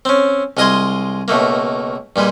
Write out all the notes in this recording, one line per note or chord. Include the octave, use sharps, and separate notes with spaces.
C4 C#4
C2 G#3 F4 D#5 G#5 C6
C#2 B2 A3 A#3
G2 A#2 G3 G#3